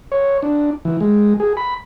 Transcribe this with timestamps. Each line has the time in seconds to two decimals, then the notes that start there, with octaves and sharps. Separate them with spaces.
0.12 C#5
0.43 D4
0.85 E3
1.01 G#3
1.40 G#4
1.57 B5